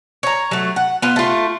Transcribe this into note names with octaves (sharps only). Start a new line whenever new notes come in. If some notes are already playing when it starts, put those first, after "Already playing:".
C#5 A#5
F#3 A3
F#5
B3 F4
A3 F4